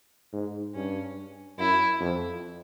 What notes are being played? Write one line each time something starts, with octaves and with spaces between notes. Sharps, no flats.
G#2
G2 C#4
F#2 E4
F2